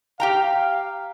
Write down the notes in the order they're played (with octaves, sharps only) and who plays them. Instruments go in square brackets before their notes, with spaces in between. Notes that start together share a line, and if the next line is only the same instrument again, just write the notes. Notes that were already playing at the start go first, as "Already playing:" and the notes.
[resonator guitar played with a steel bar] G4 G5 A#5 [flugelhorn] F5